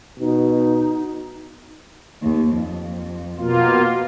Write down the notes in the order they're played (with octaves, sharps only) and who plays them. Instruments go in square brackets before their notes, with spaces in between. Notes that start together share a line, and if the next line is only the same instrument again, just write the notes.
[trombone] B2 [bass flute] D#4
[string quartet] D#2
F2
[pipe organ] B2 A#3 F4